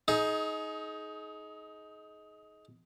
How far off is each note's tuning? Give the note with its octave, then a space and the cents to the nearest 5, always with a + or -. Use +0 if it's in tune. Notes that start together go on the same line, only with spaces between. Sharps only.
D#4 +15 G#4 +35